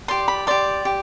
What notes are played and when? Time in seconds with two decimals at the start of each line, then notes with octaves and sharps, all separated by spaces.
0.08 G4 D5 C6
0.28 B5
0.47 G4 D5 C6
0.85 G4